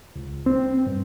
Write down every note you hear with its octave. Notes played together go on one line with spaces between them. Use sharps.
C#2
C4
G2